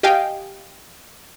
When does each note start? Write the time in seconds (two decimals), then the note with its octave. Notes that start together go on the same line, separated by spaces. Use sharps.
0.03 G4 D#5 F5 G5 G#5